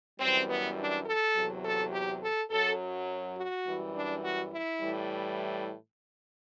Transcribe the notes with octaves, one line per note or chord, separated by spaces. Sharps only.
F#2 E3 G3 C4
B3
D4
A4
E2 C3 F#3
A4
G4
A4
F#2 F#3 A4
F#4
F#2 E3 G3
D4
F#4
E4
A2 E3 G3